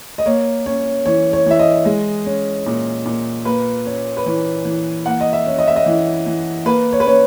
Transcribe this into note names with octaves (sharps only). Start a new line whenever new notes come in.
D#5
A#3 C#5
C#4 C#5
E3 C#5
C#5
E3 E5
D#5
G#3
C#4
A#2
A#2
A#3 B4
C#4 C#5
B4
E3 C#5
E3
A#3 F#5
D#5
E5
C#4
D#5
E5
D#5
E3
E3
A#3 B4
C#5
B4
C#4 C#5